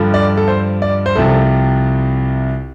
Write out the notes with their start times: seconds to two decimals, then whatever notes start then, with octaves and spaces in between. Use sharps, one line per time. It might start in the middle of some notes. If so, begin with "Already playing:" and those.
Already playing: G2 D3 F3
0.14 D5
0.37 A4
0.48 C5
0.82 D5
1.06 C5
1.15 C2 C3 F3 A4